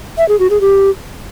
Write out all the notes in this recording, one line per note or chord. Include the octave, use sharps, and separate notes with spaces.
E5
G#4
F#4
G#4
G4